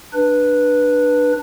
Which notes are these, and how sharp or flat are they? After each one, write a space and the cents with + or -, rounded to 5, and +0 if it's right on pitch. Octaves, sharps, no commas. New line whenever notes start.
D4 +15 B4 -10